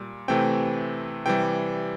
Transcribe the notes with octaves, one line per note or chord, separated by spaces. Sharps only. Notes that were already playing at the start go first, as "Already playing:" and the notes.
Already playing: A#2 G3
C3 E3 A3 C4 G5
C3 E3 G3 G5